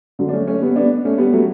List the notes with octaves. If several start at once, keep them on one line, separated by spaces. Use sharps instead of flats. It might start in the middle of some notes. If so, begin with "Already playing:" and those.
D3 F#3
D4
A3 C#4
A3 C#4
G3 B3
B3 D4
A3 C#4
G3 B3
F#3 A3